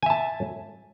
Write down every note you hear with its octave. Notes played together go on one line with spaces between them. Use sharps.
E5 G#5 A5